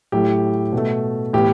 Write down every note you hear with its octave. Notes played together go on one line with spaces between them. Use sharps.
A2 F#3 A3 G4
B2 A3
A2 E3 B3 G4